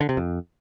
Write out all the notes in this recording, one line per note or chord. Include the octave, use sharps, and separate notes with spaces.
D3
C3
F2